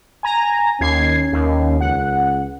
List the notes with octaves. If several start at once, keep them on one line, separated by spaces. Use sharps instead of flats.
G#5 A#5
D#2 C#4 G#6 C7
D#2
C#2 F#5